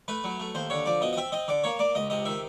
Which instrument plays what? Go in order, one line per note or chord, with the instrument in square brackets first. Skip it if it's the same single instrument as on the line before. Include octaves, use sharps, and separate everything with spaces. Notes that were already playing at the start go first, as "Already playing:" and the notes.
[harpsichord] A3 B4
F#3
A3
D#2 C5
D3 C#5
F3 D5
B2 D#5
D#5
C4 E5
C4 D#5
D3 D5
A#3 C#5
A#3 D5
C#2 D#5
C3 D#5
D#3 E5